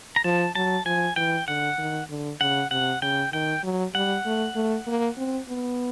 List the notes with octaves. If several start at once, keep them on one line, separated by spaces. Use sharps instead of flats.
A#5
F3 A5
F#3 A5
F3 G#5
E3 G5
D3 F#5
D#3
D3
C#3 F#5
C3 F#5
C#3 G5
D#3 G5
F#3
G3 F#5
A3
A3
A#3
C4
B3